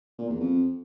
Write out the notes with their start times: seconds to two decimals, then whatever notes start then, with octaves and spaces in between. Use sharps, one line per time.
0.18 A#2
0.29 E2
0.40 F2